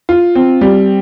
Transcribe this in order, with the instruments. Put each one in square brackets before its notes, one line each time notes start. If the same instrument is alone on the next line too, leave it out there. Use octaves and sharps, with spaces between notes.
[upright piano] F4
C4
G3